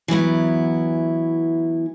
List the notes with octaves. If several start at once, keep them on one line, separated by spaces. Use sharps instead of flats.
E3 F#3 B3 E4